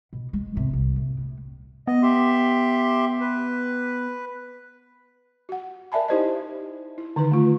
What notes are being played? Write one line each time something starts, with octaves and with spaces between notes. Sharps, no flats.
B2
G#3
G#1 C3
C2
A#2
A2
B3 D#5
G4 E5 C6
B4
F#4 F#5
A#4 D5 E5 G#5 A5 B5
D#4 E4 G4 C5 D5 D#5
E4
D3 D#3 D#4 B4
A3 F4